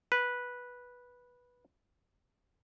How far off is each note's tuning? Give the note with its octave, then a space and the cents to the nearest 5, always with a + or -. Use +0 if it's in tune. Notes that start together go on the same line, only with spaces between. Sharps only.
B4 -10